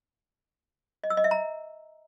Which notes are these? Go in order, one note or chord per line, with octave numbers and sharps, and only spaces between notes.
D#5
E6
D#5
E5
A#5